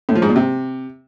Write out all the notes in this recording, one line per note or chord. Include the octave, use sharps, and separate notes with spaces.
A2
F3
G#2
A#2
C3